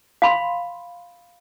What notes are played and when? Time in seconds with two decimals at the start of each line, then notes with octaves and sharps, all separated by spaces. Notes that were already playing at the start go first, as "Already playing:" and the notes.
0.22 F5 B5 C6